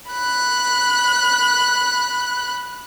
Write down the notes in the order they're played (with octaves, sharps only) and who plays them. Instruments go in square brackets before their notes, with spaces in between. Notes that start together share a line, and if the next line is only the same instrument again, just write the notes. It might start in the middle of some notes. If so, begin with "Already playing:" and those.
[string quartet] B5 F#6